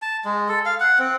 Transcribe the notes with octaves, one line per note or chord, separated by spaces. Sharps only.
A5
G#3
A4
F5
F#5
C4